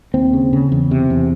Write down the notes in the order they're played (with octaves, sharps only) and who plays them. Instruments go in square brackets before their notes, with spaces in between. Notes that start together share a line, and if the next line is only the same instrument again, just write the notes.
[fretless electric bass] D#2 C4
C#3
C#3
E2
C3
E2